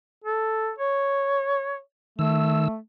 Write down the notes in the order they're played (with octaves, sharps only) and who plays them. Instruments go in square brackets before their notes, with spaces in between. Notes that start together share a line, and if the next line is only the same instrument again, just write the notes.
[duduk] A4
C#5
[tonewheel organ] D#3 E6 [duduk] A3